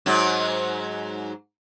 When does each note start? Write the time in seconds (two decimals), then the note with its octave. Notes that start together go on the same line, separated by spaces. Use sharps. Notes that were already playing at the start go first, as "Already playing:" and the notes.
0.06 G#2 F#3